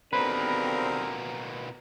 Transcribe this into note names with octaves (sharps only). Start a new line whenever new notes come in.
D#2 B2 D3 A#3 C4 A#4 B4